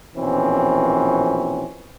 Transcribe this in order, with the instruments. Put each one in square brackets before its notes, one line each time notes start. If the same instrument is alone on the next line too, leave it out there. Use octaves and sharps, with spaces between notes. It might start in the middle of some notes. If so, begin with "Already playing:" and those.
[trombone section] A#1 B2 E3 C4 C#4